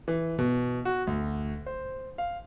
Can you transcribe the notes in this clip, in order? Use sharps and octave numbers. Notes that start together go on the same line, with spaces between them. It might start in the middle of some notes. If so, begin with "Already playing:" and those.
E3
B2
F#4
D2
C5
F5